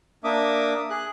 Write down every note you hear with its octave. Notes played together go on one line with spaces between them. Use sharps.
A#3 D4 E5 D6 D#6
G#4 F#6